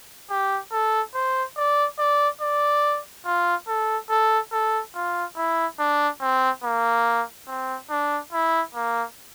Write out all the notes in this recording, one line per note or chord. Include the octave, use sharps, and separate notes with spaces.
G4
A4
C5
D5
D5
D5
F4
A4
A4
A4
F4
E4
D4
C4
A#3
C4
D4
E4
A#3